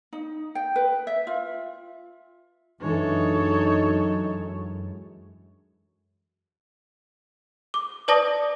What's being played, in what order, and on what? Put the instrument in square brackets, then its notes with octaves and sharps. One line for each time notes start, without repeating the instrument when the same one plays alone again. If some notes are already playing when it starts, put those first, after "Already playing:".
[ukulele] D#4
G5
B4
E5
F4
[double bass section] F#2 [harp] E3 G#3 D4 [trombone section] D#4 [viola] A4 C#5
[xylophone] D6
B4 D5 A5 D6 D#6 A#6